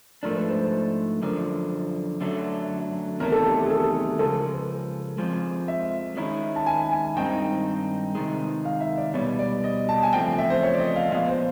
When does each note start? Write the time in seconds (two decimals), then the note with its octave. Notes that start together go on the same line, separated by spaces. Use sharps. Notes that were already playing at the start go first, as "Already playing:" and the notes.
0.23 G#2 F3 A3 D4 A#4
0.35 B4
0.49 C5
0.60 C5
1.22 F#2 D3 F3 A#4
2.21 F#2 D3 F#3 A3
3.20 E2 C3 D#3 F#3 A3 A#4
3.32 A4
3.46 G4
3.58 G4
3.66 G#4
3.70 A4
4.19 C#3 F3 G#3 A4
4.36 A#4
4.53 B4
5.18 F2 C#3 F3 G#3
5.68 E5
6.17 D#3 G#3 C#4 E4
6.56 A5
6.66 G#5
6.92 G#5
7.16 G2 D#3 G#3 C4 D#4 G5
8.15 C3 D#3 G#3
8.65 F5
8.81 E5
8.97 D5
9.14 B2 G3 B3 C#5
9.39 D5
9.64 D#5
9.89 A5
10.03 G#5
10.13 E2 C#3 F3 A3 C4 G5
10.38 E5
10.50 C5
10.63 C#5
10.74 D5
10.79 D#5
10.96 F5
11.11 A#2 F3 G#3 B3 F5
11.28 C5